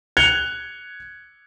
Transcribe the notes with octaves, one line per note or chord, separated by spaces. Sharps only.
F#6 G#6 C#7 F7 G7